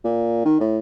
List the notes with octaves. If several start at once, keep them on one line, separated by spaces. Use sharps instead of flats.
A#2
D#3
A2